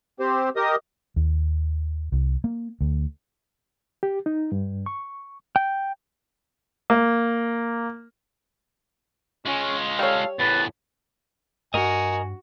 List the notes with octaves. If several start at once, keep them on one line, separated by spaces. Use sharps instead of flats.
C4 G4 C5
G4 A#4 D#5 D#6
D#2
C2
A#3
D2
G4
D#4
G2
C#6
G5
A#3
G#3 C#4 F4
G3 A4 C#5 F5
E2 A2 B4 A6
G2 F#4 A#4 D#5 G#5